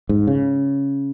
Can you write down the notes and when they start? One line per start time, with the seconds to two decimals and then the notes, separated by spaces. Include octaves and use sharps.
0.09 G#2
0.27 C#3